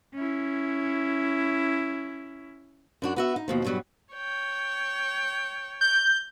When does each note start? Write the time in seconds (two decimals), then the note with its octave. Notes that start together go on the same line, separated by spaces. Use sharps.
0.15 C#4 E4
3.02 F#2 D4 F#4
3.16 B3 F#4 E5
3.36 D#4
3.48 D#2 B2 F3
3.64 G2 B2 F#3 G3
4.14 C#5 G5
5.81 G6